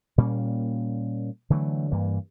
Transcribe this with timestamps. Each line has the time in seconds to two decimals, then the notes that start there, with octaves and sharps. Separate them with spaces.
0.18 A#2 G3 A#3 C#4
1.50 D3 E3 F#3 A3
1.92 G2 E3 A#3